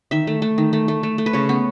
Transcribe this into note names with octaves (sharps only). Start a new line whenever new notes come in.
D#3 E5
A3
A3
D#3
A3
A3
A3
A3
B4
C#3 C#5
B3